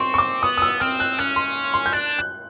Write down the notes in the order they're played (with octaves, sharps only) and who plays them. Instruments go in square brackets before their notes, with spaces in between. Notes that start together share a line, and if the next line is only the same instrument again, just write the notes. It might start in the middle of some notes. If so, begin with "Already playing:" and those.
Already playing: [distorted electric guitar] C4 [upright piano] C6 C#6
[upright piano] C#6
D6
[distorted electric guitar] B3 [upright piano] D#6
[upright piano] D#6
E6
[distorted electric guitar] C4 [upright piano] F6
[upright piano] F#6
[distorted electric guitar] C#4 [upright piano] F#6
[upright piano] C6
C6
G6
[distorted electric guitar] D4 [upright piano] F#6
[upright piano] F#6